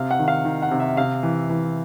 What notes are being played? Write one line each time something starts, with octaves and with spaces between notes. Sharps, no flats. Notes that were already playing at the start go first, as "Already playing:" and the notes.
Already playing: C3 F5
F#5
D#3
F5
D#3
F#5
C3
E5
C3 F5
E3
E3